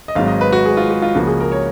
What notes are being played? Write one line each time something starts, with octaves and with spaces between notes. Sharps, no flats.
D#5
G#1 G#2 F#3 F5
D#5
B4
F#4
G#4
F4
F#4
F4
C#2 C#3 F3 A#3 F#4
G#4
A#4
C#5